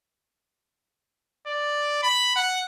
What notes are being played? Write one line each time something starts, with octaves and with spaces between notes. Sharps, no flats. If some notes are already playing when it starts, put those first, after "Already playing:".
D5
B5
F#5